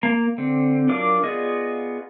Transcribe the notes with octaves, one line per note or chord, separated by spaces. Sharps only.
A#3 A#5
D3 C4
F#3 D4 F4 A#4 D6
B3 F4 G#4 D5 D#5